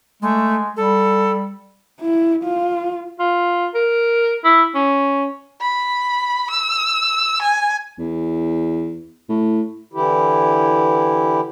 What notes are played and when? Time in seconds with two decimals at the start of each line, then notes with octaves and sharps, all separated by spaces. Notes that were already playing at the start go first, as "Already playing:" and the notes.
0.22 G#3 A3
0.77 G3 A4
2.00 E4
2.44 F4
3.19 F4
3.75 A#4
4.44 E4
4.75 C#4
5.61 B5
6.50 E6
7.42 G#5
7.99 E2
9.29 A2
9.93 D3 E3 E4 G4